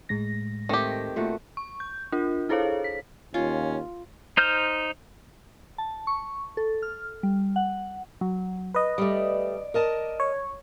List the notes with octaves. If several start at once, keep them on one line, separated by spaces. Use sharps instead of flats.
A2 G#3 A#6
D#3 A3 C4 G4
A#2 A3 F#4
C#6
G6
D4 F4 A#4
E4 G#4 A4 C5 C#5 F5
B6
D#2 C#4 F4
D#4 C5 F6 G6
A5
C#6
A4
F6
G3
F#5
F#3
B4 D#5
G3 A3 D5
A#4 D#5 A5
C#5